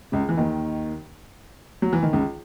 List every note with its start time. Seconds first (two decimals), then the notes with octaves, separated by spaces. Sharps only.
0.12 C#2 C#3
0.29 E3
0.37 D#2 D#3
1.82 F#3
1.93 E3
2.03 D#3
2.13 C#2 C#3